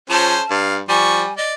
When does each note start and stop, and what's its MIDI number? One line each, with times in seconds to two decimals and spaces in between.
0.10 0.35 53
0.10 0.41 61
0.10 0.41 68
0.10 0.41 72
0.10 0.60 81
0.50 0.82 43
0.50 0.76 77
0.89 1.23 53
0.89 1.32 55
0.89 1.35 80
0.89 1.23 85
1.37 1.54 74
1.37 1.55 75